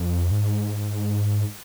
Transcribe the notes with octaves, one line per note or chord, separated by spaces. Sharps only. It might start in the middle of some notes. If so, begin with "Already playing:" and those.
Already playing: F2
G#2